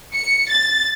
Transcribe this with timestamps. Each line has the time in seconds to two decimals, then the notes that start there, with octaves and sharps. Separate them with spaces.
0.13 C#7
0.51 A6